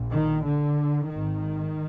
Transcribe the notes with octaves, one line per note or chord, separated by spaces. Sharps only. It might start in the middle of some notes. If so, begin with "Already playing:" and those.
Already playing: A#1 A#2
D#3
D3
G#1 D#3